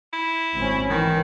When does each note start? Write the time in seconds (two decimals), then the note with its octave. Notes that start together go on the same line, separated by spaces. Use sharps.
0.13 E4
0.58 G#1 C4 C#4
0.90 D#3 E3